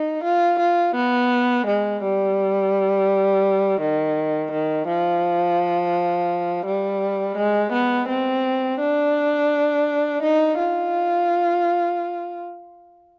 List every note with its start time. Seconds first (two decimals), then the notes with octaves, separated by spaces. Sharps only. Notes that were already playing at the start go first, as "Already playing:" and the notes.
Already playing: D#4
0.24 F4
0.59 F4
0.96 B3
1.67 G#3
2.03 G3
3.81 D#3
4.52 D#3
4.88 F3
6.66 G3
7.37 G#3
7.73 B3
8.08 C4
8.80 D4
10.23 D#4
10.58 F4